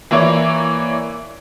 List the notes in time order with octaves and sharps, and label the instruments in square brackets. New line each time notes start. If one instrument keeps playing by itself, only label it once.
[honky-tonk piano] E3 A#3 E4 C#5 D5